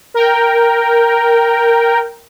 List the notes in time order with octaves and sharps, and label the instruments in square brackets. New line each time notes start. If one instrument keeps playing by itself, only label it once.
[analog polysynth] A#4 G5